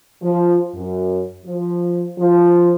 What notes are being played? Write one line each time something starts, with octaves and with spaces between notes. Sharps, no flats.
F3
F#2
F3
F3